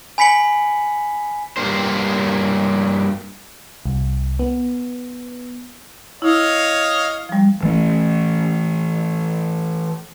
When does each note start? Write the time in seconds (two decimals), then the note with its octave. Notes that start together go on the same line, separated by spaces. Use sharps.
0.18 G#5 B5 B6 C#7 F#7
1.57 G2 B2 A#3 C5
3.86 C2
4.39 B3
6.22 E4 C#5 D#5 F5
7.29 F3 G3
7.63 E3 A3